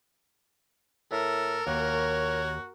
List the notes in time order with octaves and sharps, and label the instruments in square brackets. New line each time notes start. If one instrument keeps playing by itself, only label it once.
[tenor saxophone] A2 [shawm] A4 [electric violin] A#4
[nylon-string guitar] D#2 [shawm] F#4 [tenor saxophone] C#5